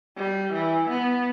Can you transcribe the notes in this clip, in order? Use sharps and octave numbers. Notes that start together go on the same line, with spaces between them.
G3
E3
B3